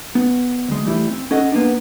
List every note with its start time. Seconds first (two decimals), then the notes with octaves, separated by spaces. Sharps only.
0.15 B3
0.69 D2 G#3
0.85 E3 G3 A3 E4
1.10 C4
1.31 C#4 A4 D#5 F#5
1.52 A#3 B3 D4